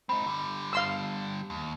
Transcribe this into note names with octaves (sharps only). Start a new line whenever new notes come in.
C4 D#4 B5
D3 G3
F5 C6 E6
D#2